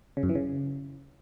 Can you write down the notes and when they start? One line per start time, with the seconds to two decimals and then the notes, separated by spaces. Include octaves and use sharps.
0.17 C#3
0.23 F#2
0.29 E3
0.35 C#3